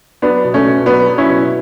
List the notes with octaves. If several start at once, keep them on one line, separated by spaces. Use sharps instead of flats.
F#3 B3 D4
B2
A3 C#4
B2
F#3 B3 D4
F#3
C#4 E4
B2